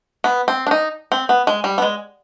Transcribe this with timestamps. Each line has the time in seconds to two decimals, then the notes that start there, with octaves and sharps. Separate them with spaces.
0.24 B3
0.48 C4
0.67 D4
0.71 D#4
1.12 C4
1.29 B3
1.47 G#3
1.64 G3
1.78 B3
1.82 G#3